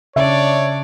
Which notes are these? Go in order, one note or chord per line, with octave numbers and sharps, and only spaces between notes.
C#3 D4 C#5 D5 E5